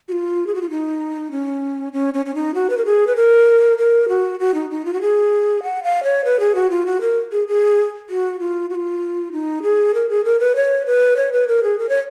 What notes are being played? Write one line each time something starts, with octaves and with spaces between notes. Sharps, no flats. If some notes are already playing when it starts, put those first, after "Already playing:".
F#4
F4
G#4
F#4
F4
D#4
C#4
C#4
C#4
C#4
D#4
F#4
B4
A#4
G#4
B4
A#4
A#4
F#4
F#4
D#4
D#4
F4
F#4
G#4
F#5
F5
C#5
B4
G#4
F#4
F4
F#4
A#4
G#4
G#4
F#4
F4
F#4
F4
D#4
G#4
A#4
G#4
A#4
B4
C#5
B4
C#5
B4
A#4
G#4
A#4
C#5